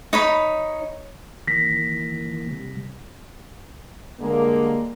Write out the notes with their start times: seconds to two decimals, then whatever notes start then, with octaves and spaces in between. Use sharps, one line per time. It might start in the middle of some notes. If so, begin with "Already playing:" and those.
0.13 D#4 C#5 B5
1.47 D#3 E3 A#3 A#6 B6
2.51 C3 G3
4.20 D3 G3 G#3 A#3